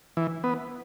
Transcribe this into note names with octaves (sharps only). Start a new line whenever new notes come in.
E3
B3